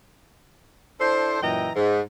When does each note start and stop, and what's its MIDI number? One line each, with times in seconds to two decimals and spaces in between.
1.00 1.40 62
1.00 1.40 64
1.00 1.40 69
1.00 1.40 72
1.42 1.71 42
1.42 1.71 46
1.42 1.71 52
1.42 1.71 75
1.42 1.71 79
1.42 1.71 82
1.76 2.00 44